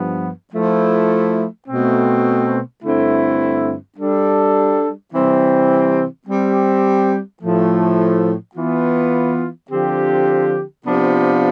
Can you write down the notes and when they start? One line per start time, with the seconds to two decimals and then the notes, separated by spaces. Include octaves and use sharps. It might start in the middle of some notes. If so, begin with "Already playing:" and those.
Already playing: G2 F3 B3
0.54 F3 A3 E4
1.68 B2 A3 C4
2.83 G2 D3 A3 C4 E4
3.97 G3 D4 A4
5.12 C3 E3 G3 C4
6.27 G3 C4 G4
7.42 A2 F3 A3
8.56 E3 B3 F4
9.71 D3 F3 C4 G4
10.85 C3 F3 B3 D4 F4